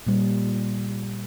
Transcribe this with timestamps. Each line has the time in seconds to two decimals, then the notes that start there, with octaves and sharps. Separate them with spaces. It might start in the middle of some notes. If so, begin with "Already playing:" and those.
0.07 A#2 G3